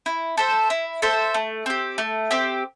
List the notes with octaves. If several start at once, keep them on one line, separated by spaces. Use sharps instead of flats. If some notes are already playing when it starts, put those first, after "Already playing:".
E4
A4 C5 E5
E4
A4 C5 E5
A3
C4 G4
A3
C4 G4